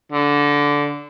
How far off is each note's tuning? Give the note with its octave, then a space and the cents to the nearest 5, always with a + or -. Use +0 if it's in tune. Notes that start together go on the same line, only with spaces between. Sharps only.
D3 -15